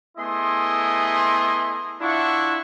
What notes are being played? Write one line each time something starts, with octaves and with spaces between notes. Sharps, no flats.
A3 B3 E4 G#4 D#5 C6
D4 E4 F4 E5 F#5 C#6